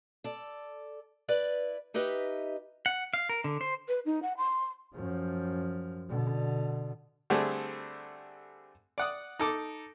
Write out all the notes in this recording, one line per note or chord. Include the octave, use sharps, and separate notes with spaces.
A4 D5
E4 B4 D5
D#4 G4 B4 D#5 E5
F#5
F5
A#4
D3
C5
B4
D#4
F#5
C6
F#2 F3
B2 D3
D3 G3 A3 C4 G#4
D5 F#5 D#6
D#4 A4 D6